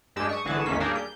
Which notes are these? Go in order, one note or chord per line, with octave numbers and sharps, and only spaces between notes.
G2 G#3 D4 G4 E6
C#6 D#6
G#1 D3 E3 F#4 G#4 A5
A1 E2 D#3 A#3 C#4 B6
G3 A#3 D4 G4 G#4 A#4
G6